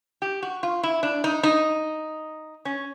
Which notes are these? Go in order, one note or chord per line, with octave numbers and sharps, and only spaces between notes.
G4
F#4
F4
E4
D4
D#4
D#4
C#4